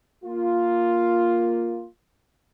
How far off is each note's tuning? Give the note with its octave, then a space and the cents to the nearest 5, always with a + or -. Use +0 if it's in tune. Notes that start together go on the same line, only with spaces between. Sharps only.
A#3 +0 F4 +0